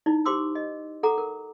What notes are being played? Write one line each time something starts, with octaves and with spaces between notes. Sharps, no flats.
D#4 E4 D5
G4 C5 C6 D6 E6
D#5
A4 F#5 A#5 D6
A#4